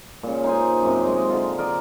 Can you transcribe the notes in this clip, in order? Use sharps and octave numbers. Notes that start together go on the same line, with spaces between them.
A#2 C#3
D#4 G#4 C5 G#5
F#2 C3
G#3 D#5
D3 F4
A#4 D5 D#5